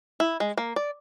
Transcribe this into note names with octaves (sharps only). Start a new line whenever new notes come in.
E4
G#3
A#3
D5